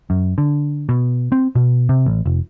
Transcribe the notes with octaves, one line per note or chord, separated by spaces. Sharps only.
F#2
D3
B2
C4
B2
C3
A1
F1